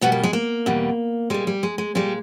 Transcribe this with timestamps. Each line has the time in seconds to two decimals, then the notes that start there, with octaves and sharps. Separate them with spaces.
0.01 E2 B2 G3 B3
0.12 A#3
0.23 G#3
0.33 A#3
0.66 E2 B2 G3
1.30 A#2 G3 G#3
1.47 G3
1.63 G#3
1.78 G#3
1.95 A#2 G3 G#3